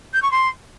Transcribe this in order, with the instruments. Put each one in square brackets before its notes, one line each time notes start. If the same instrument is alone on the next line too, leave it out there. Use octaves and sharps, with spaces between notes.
[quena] G6
C#6
C6